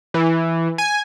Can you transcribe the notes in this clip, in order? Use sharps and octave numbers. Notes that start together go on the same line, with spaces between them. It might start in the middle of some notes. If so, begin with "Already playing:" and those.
E3
G#5